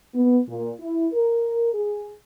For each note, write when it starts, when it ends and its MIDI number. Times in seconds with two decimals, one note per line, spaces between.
0.14 0.39 59
0.48 0.72 46
0.80 1.07 64
1.13 1.69 70
1.73 2.11 68